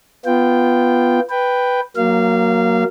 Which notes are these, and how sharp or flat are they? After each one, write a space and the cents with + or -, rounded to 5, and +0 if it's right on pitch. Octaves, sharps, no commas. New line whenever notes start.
B3 +0 F4 -10 G5 +0
B4 +0 G5 +5
F#3 +0 A#3 +0 F5 -25